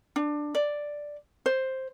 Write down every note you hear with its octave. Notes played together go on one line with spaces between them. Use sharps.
D4
D5
C5